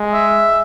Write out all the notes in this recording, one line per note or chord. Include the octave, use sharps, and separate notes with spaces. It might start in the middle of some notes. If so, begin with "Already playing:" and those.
Already playing: G#3
E5